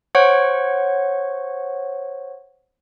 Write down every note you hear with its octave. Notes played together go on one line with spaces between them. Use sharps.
C5 C#5 F#5 C#6